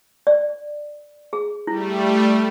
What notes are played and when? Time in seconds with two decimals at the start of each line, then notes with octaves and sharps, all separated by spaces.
0.27 D5
1.33 G#4
1.67 G3 A3 E4